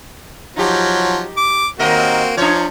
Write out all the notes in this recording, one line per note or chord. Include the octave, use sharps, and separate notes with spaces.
F3 F#3 D#4 G4
D6
D#2 A#3 C4 F#4 A#4 D#5
F3 D4 C#5